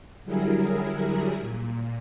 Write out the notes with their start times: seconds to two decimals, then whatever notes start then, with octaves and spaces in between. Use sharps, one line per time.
0.24 D3 F#3 G3 E4 G#4 A#4
1.40 A#2